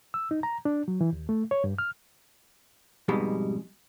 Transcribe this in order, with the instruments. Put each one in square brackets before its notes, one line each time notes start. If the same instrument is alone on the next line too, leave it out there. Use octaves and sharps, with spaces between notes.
[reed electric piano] E6
D#4
A#5
D4
F#3
E3
D#2
A3
C#5
G2
F6
[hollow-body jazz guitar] F2 G#2 B2 G3 G#3